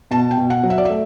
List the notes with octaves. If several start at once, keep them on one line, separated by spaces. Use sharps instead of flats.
B2 A5
G5
B2
F#5
F#3
E5
D5
A3 E5